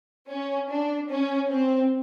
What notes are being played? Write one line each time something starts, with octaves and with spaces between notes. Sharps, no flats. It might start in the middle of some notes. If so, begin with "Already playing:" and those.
C#4
D4
C#4
C4